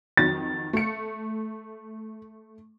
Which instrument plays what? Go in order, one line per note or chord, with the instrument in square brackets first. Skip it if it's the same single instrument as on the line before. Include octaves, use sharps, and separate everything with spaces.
[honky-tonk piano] F2 D#3 F#3 [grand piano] A6
[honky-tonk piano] A3 C#7